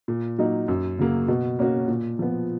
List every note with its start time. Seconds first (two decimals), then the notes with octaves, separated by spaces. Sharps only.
0.08 A#2
0.38 F#3 A#3 D#4
0.68 F#2
0.99 C#3 F#3 A#3
1.28 B2
1.59 A#3 C#4 F#4
1.88 A#2
2.19 F3 B3